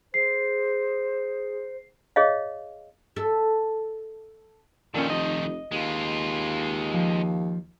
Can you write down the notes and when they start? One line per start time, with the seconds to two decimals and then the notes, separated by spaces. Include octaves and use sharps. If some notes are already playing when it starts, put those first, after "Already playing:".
0.14 G#4 C5 C7
2.16 G#4 C#5 D#5 F5
3.16 A4 E5
4.94 A#2 D#3 F3 C#4 A4
5.10 F1 D#5
5.72 D#2 G#3 F4
6.94 F3